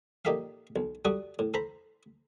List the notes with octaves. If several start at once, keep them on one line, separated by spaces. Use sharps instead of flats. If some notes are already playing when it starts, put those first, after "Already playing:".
A#2 D#4 G4 A4 E5 F5
B1
G3 F#4 A4 D#6
A2
A4 C5 A#5 B5